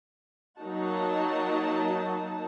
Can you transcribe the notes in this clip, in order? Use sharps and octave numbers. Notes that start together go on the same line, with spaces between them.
F#3 A#3 D#4 F#4 A5